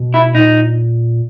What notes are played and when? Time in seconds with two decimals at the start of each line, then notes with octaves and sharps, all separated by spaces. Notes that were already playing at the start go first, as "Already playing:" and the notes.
Already playing: B2
0.14 E4
0.34 A#2 D#4